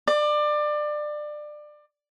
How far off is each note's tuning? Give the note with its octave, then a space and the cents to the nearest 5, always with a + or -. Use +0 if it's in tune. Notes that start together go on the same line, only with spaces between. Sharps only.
D5 +25